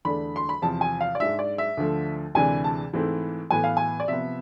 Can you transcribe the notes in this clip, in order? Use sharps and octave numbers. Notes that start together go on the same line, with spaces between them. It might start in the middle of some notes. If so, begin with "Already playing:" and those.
E2 D3 A3 D4 B5
C6
B5
E2 C3 F3 A5
G#5
F5
D5
G#2 G#3 D4 E5
D5
E5
D2 D3 F3 A3
D2 C3 E3 G#3 D4 G#5
A5
G#2 E3 A3 C4 E4
A2 E3 B3 G#5
F5
G#5
D5
C3 F3 B3 E5